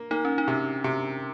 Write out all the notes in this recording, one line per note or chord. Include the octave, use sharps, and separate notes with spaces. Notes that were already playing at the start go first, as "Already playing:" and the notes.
Already playing: A#3
A#3 D#4
C#4
D#4
C3
C3